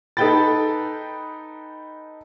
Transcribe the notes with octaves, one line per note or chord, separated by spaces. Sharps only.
D#4 A4 B4 G5 B5 A6